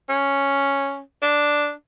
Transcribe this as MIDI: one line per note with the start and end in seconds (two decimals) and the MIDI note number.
0.10 1.00 61
1.22 1.71 62